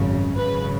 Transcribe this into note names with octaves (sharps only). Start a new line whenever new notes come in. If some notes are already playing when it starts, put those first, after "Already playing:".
Already playing: G#1 F#2 C#3
G#1 F#2 C#3 B4